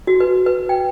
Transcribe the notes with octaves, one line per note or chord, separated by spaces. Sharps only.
F#4
B4
B4
G5